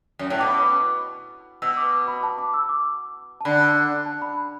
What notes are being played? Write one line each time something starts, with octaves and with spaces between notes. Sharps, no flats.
F#2
A2
B2 D6
B5
D6
B2 E6
D6
D6
B5
A5
D6
E6
D6
A5
D3 B5
F#5
A5
B5